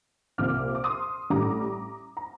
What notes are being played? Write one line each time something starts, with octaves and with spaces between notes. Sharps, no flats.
C2 A#2 F3 C4 D6 F6
D6
C6 D#6
A1 A2 G3 A#5 D6
A#5